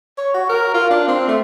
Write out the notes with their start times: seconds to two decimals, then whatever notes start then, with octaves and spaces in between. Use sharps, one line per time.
0.18 C#5
0.34 F#4
0.49 A#4
0.74 F4
0.90 D4
1.08 C4
1.28 A3